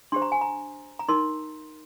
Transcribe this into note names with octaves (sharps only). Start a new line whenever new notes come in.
D4 G4 C5 C6
A#5
G#5
A#5
A#5
D#4 A#4 C6